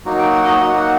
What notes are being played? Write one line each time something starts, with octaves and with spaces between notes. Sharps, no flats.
F#3 A#3 D#4 F#4
G5
F#5
D#5
F#3 A#3 D#4 F#4 F#5
F#5